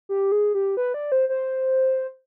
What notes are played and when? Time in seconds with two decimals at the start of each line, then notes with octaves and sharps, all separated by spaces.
0.09 G4
0.32 G#4
0.54 G4
0.77 B4
0.94 D5
1.12 C5
1.29 C5